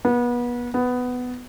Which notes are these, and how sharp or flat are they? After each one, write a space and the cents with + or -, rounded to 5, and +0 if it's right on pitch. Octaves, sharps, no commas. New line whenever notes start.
B3 -30
B3 +10